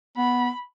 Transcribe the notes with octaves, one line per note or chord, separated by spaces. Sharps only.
B3 B5